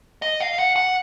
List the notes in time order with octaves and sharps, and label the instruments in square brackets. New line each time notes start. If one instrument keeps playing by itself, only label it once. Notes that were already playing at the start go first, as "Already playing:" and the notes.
[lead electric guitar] D#5
F5
F#5
F#5